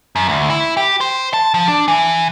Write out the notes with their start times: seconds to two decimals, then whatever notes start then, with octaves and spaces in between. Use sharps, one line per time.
0.16 F#2
0.29 D2
0.50 E4
0.77 G4
1.01 C5
1.33 A5
1.54 F3
1.68 D4
1.88 E3